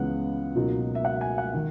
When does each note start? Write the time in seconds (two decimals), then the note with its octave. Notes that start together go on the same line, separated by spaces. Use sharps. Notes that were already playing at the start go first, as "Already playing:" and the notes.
Already playing: C#2 C#3 E3 G#3 B3 F#5
0.55 C#2 B2 F#3 A#3 D#4
0.95 E5
1.05 F#5
1.21 G#5
1.38 F#5
1.54 D#3